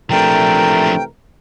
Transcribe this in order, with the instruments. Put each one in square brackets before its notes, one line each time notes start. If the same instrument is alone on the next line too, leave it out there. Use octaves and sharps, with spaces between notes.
[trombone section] C3 E3 A3 [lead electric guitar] F3 D4 [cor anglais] A#4 [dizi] G5